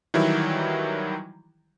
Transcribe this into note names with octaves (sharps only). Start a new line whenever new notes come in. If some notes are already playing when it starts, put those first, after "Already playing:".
D#3 E3 F#3 G3 E4